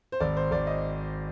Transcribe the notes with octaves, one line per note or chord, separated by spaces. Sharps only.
C5
G#1 D5
C5
G#1 D5
D#5